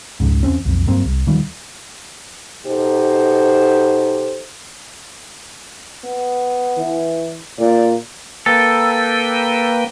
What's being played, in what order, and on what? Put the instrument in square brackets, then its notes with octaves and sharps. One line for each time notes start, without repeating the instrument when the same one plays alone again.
[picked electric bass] F1 C#2 G#2
E2 C4 C#4
B1 F2
G2 F#3 A#3 C4
C2
D#1 D#3 F3 G3
[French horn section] B2 D#4 G4 A4 C5
[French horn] B3
[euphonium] E3
[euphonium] A#2 [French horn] D5
[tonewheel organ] A#3 B4 G5 [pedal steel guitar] A4